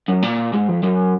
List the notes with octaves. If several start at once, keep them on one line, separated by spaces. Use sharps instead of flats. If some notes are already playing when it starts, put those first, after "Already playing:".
F#2
A#2
G#2
F2
F#2